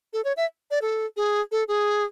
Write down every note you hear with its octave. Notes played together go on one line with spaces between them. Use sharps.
A4
C#5
E5
D5
A4
G#4
A4
G#4